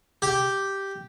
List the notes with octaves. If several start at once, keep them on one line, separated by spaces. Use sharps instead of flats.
G4